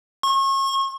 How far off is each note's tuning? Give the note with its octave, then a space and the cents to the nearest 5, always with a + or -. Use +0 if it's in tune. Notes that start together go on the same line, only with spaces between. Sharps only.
C#6 -35